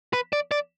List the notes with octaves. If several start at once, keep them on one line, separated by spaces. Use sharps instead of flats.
B4
D5
D5